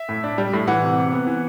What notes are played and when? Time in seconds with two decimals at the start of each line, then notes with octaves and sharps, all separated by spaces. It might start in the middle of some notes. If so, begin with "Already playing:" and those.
Already playing: E5
0.09 A2
0.24 D4
0.38 G3
0.53 A2
0.67 E3 F#5
0.83 C3
0.97 C3
1.12 B3
1.27 E3